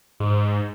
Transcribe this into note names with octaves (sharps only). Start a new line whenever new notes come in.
G#2